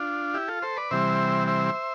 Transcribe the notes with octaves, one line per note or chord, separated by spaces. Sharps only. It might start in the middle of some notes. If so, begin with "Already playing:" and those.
Already playing: D4 F4
E4 G4
F4 A4
A4 C5
B4 D5
C3 E3 G3 C4 C5 E5
C5 E5